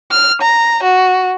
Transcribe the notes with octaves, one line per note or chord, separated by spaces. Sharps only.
F6
A#5
F#4